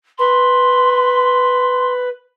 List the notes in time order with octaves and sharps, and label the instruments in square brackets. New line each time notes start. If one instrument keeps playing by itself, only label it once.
[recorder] B4 [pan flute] C6